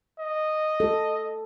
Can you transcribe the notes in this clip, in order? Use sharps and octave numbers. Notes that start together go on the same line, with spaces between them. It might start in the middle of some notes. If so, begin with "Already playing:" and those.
D#5
A4